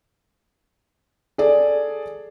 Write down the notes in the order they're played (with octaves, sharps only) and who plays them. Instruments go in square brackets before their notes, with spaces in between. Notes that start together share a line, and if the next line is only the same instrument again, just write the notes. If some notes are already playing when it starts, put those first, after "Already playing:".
[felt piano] G#4 A4 D5